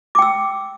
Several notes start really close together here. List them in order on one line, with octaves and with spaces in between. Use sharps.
D6 G5 E6